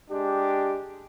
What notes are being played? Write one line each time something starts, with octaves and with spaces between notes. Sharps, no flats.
G#3 D4 G4